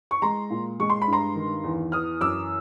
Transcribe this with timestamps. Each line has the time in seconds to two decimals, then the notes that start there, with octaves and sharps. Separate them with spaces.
0.11 C#6
0.22 G#3 A#5 C6
0.50 A#2
0.80 G#3 C#6
0.90 C6
1.02 B5
1.07 G2
1.13 A#5 C6
1.35 D#3
1.64 E2
1.92 E3 D#6 F6
2.21 F#2 D6 E6